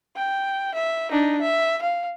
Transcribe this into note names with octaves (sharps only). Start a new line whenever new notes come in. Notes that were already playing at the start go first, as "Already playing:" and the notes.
G5
E5
D4 D#4
E5
F5